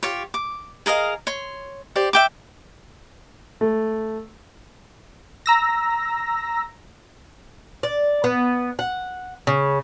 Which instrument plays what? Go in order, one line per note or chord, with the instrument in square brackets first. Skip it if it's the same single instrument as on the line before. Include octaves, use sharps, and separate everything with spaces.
[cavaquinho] F4 G4 C#5
D6
G#4 A#4 D#5 F5
C#5 C6
G4 C5 D5
E5 G5 D6
[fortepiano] A3
[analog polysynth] A#5 E6 A#6
[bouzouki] D5
B3
F#5
C#3